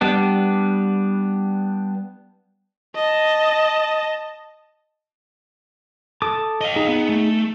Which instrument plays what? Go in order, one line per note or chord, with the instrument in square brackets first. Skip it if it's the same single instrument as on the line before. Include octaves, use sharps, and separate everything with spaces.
[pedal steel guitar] G3 B3 D4
[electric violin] D#5 A5
[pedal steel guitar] A4 D6 D#6
[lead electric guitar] D#5 F5
[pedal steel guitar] D#4 G#4
[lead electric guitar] B3
A3